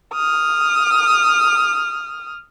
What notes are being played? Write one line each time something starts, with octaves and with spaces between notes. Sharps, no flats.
D#6 F6